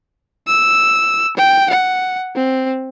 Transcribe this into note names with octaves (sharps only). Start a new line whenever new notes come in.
E6
G5
F#5
C4